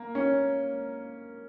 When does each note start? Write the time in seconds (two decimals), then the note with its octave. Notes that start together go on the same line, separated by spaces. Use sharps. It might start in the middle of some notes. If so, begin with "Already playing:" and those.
Already playing: A#3
0.15 C#4